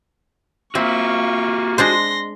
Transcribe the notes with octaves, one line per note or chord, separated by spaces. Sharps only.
A#3 C4 F4 F#4 E5 C#6
G#3 D4 C5 C6 A#6